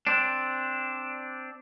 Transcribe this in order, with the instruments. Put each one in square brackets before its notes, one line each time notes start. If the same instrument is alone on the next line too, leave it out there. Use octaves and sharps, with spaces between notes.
[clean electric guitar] C4 D4